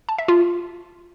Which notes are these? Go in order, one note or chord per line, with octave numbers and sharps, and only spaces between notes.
A5
E5
F4